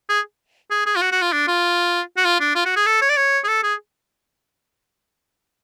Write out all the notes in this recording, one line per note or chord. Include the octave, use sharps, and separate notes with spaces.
G#4
G#4
G#4
F4
F#4
F#4
F4
D4
F4
F#4
F4
D4
F4
F#4
G#4
A4
C#5
D5
C#5
G#4
A4
G#4